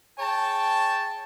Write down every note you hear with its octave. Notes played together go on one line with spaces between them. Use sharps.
G#4 C#5 G5 A5